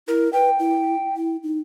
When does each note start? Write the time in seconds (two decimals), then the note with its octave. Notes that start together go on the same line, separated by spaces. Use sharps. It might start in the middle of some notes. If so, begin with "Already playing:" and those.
0.08 E4 A#4
0.33 B4 G5
0.59 E4
1.17 E4
1.43 D#4